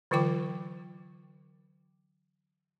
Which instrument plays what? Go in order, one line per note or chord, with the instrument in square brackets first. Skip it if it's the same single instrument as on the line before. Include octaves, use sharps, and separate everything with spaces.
[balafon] D3 E3 F#3 F4 G5 D6